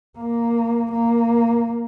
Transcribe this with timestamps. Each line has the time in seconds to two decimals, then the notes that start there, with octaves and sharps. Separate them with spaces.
0.18 A#3
0.92 A#3